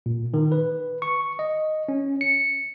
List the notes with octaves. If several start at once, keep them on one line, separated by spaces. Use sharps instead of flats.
A#2
D#3
B4
C#6
D#5
C#4
C#7